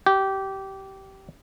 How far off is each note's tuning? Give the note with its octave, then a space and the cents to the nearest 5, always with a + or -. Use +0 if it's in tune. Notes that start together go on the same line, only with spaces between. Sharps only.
G4 -20